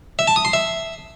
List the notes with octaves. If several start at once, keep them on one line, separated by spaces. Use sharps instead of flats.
E5
A5
D#6
C6
E5